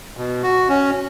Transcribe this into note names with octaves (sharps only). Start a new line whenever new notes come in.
B2
F#4
C#4